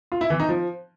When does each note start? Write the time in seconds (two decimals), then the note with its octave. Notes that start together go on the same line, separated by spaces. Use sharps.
0.12 F4
0.21 E4
0.30 E3
0.40 D#4
0.49 F3